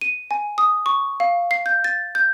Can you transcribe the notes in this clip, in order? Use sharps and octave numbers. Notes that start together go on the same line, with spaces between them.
D#7
G#5
D#6
C#6
F5
C7
G6
A6
G6